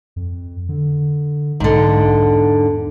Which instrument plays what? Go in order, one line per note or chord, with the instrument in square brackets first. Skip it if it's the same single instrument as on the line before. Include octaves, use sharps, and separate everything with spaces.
[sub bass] F2
D3
[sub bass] B1 [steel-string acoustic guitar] G#2 D3
[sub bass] E2